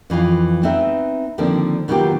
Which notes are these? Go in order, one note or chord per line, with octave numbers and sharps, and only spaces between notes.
F2 E3 F4 F5
B3 C4 D#4 B4 E5
D3 D#3 F3 A#3 C4 D4
B2 D#3 F#3 A#3 F4 G4